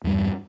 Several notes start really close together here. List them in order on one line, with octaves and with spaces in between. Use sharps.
E2 G3 G2